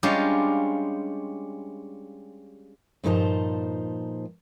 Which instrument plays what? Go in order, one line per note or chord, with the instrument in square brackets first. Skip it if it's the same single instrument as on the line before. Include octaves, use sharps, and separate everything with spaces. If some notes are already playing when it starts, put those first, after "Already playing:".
[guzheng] G3 G#3 C#4 D4 F4 G4
[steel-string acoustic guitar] G2 A#2 F3 D#4 C5 A5